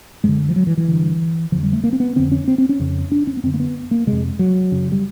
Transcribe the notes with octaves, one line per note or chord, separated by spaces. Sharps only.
F#2 D3 G#3
F3
F#3
E3
E3
G2 D3
F2 D3 F3
G3
A3
A#3
C4
B3
F2 D3 C4
C#4
C4
C4
C#4
F2 C#3
D4
C#4
B3
F#2 D3 C4
A#3
B3
A#3
F2 C3 G#3
F#3
F#2 C#3
G3